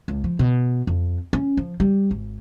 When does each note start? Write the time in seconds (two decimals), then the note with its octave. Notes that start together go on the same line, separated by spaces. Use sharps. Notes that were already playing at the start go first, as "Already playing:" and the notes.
0.08 C#2
0.24 F3
0.39 B2
0.87 F2
1.33 C#4
1.57 F3
1.80 G3
2.11 G#1